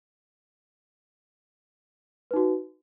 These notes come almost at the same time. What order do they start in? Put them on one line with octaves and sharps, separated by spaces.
B4 D#4 F#4